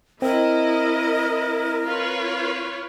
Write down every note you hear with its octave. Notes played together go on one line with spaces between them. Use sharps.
C4 E4 A#4 D#5
F4 B4 C#5